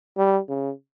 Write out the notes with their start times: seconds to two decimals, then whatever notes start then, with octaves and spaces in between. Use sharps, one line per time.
0.17 G3
0.49 C#3